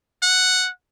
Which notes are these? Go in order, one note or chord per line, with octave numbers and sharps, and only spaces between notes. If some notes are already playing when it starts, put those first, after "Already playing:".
F#5